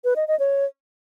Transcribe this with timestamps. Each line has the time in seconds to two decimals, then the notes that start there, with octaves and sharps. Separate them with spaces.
0.04 B4
0.16 D#5
0.28 D#5
0.39 C#5